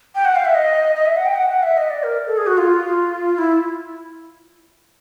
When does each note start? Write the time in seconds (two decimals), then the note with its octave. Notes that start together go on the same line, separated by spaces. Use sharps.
0.15 G5
0.25 F#5
0.36 F5
0.45 E5
0.55 D#5
0.95 D#5
1.06 E5
1.17 F#5
1.26 G5
1.36 F#5
1.50 F#5
1.63 E5
1.77 D#5
1.90 D5
2.04 A#4
2.27 A4
2.37 G#4
2.47 F#4
2.57 F4
3.38 E4